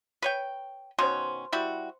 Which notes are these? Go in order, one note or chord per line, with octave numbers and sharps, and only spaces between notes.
B4 C#5 G5
B2 D#3 C#4 C5 C6
G3 E4 F#4